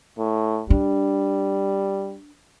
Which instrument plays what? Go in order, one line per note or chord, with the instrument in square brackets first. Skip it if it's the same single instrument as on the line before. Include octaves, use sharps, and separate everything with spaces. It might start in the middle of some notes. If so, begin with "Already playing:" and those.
[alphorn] A2
[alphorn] G3 [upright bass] D4